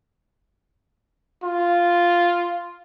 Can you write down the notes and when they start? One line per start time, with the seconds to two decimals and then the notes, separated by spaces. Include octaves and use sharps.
1.43 F4